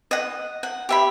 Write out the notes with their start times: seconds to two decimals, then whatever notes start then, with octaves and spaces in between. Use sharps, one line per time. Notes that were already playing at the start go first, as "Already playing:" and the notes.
0.11 D#5 F#5
0.63 F#5
0.89 G4 E5 B5